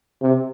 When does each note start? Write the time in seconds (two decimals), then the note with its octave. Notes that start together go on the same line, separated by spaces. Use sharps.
0.22 C3